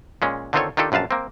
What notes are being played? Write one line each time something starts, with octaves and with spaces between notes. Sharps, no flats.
A#2 G#3 C#4
D3 D#3 C4 F4 A4 C#5
D#3 D4 F4 G4 A4
A#1 F#2 B4 F5 A5
A#3 C4